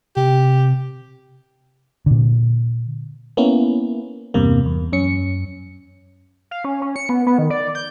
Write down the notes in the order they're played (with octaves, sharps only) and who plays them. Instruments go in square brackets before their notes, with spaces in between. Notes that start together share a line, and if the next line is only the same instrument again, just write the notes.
[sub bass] C3 [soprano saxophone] G4
[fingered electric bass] A#2 D3
[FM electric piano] A#3 B3 C#4 E4
E2 G2 C3 A#3
E2
F#2 C#4 C#7
[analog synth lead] F5
C#4
C#4
C#7
B3
B3
D#3
D5
G6